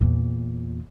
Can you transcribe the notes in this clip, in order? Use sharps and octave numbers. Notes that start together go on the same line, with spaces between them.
E2 A#2